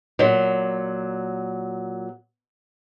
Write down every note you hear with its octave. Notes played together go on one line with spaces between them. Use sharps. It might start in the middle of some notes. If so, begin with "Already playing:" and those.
A#2 F#3